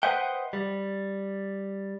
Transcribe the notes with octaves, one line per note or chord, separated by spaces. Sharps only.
B4 C5 D#5 E5 F#5 G5
G3